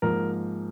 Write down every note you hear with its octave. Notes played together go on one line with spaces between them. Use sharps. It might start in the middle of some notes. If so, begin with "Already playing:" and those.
G#2 F3 A#3 A#4